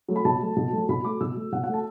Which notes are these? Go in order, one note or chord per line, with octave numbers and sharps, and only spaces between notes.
F#3 A3
B5
B2 A5
F#3 A3
B2
F#3 A3
B2 B5
A3 D6
B2 E6
A3
B2 F#5
F#5
A3 A5